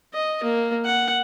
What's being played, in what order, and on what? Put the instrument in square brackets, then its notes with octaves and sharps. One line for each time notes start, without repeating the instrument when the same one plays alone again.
[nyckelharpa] D#5
A#3
F#5